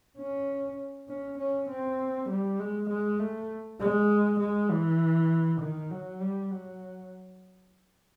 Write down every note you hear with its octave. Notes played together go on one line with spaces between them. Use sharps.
C#4
C#4
C#4
C4
G3
G#3
G#3
A3
G#3
G#3
E3
D#3
F#3
G3
F#3